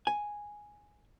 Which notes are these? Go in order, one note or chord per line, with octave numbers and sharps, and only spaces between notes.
G#5